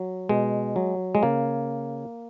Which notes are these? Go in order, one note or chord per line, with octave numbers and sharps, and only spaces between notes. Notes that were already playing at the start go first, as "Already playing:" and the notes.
Already playing: F#3
B2 G#3
F#3
G#3
C#3 A#3